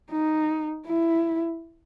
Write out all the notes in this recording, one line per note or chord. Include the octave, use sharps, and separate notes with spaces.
D#4
E4